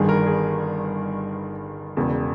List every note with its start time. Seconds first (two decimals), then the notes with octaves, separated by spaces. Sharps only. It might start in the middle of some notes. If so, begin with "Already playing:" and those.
Already playing: G1 G2 D#3 G#4
0.09 A#4
0.26 G#4
1.97 E1 E2 C#3